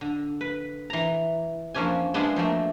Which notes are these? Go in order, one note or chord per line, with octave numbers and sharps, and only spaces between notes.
D3
B4
E3 A#5
F2 F3 A#3 C#4 D4 G#5
G#3 B3 D4 E4 F4 G#4
F3 F#3 A3 A#3